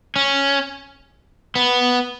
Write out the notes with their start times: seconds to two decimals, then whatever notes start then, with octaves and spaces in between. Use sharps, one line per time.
0.16 C#4
1.55 B3